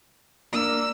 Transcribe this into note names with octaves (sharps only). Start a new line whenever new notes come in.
A#3 D4 E6